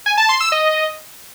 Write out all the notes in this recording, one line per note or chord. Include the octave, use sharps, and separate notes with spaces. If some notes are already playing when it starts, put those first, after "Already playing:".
G#5
A5
C6
E6
D#5